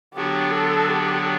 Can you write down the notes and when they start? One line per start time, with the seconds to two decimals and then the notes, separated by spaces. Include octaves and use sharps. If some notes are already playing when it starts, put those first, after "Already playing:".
0.14 D3 F#3 B3 D4 F#4 G4
0.51 A4
0.88 G4